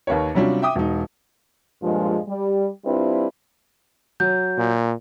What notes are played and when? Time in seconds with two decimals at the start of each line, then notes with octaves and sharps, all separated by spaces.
0.07 D#2 A#3 B4 C#5
0.35 C3 F#3 G3 C#4 D4 F4
0.62 E5 G5 D6 D#6
0.75 E1 D#4
1.83 G2 A#2 F3 G#3
2.28 G3
2.86 G3 C4 D4 E4 F4 B4
4.20 F#3 G6
4.58 A#2